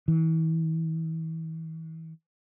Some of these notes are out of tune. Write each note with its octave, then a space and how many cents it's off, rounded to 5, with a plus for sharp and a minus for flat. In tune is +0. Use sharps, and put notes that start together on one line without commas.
E3 -35